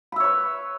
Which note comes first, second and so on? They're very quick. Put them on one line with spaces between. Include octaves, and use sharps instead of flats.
B5 E5 C#5 B4